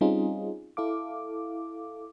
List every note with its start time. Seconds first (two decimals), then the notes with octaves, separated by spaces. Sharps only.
0.01 G3 C4 C#4 D#4 F4 G#4
0.77 E4 A4 F5 D6